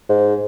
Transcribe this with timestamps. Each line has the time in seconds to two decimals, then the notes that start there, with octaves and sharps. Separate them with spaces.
0.09 G#2